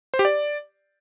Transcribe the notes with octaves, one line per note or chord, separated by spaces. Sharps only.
C5
G4
D5